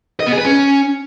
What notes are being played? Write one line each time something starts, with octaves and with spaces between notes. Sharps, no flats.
D#5
B3
G#4
B4
C#4